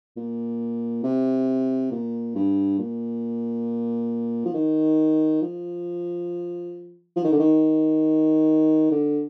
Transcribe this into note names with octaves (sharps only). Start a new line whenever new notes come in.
A#2
C3
A#2
G2
A#2
F3
D#3
F3
F3
D#3
D3
D#3
D3